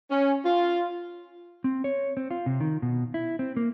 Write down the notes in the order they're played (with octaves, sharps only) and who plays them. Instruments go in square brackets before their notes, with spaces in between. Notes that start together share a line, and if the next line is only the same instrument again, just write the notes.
[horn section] C#4
F4
[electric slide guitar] C4
C#5
C4
F4
C3
D#3
B2
E4
C4
A#3